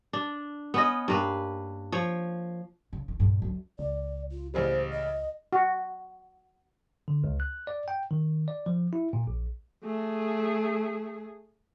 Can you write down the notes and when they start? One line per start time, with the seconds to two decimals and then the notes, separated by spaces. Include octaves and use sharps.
0.13 D4
0.74 B3 C#4 D#5
1.08 G2 A#3 B4
1.92 F3 C#5
2.93 C#3
3.08 D#3
3.20 G2 A#2
3.42 F#2 D3
3.79 C#2 D5
4.32 F4
4.54 A1 C#3 G3 C5
4.93 D#5
5.53 F#4
7.08 D3
7.24 C#2
7.40 F#6
7.67 D5
7.88 G5
8.11 D#3
8.48 D5
8.66 F3
8.93 E4
9.13 A#2
9.27 A#1
9.84 A3 G#4